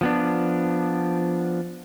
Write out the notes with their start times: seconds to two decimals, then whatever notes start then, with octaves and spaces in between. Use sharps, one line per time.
0.01 F3 B3 D4